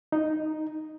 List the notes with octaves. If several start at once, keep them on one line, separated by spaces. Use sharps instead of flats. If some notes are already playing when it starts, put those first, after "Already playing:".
D#4